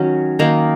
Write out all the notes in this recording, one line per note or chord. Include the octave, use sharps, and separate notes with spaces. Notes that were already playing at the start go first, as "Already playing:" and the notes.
Already playing: D#3 F#3 C#4
D#3 A#3 D#4